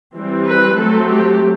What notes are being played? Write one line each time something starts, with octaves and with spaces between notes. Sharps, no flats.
E3 G3 C4
B4
F#3 A3 C4 A4
G4